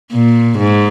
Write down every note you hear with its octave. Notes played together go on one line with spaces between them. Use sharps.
A#2
G#2